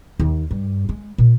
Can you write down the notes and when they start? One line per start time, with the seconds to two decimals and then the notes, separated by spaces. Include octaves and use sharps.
0.20 D#2
0.51 G2
0.89 G#3
1.18 A#2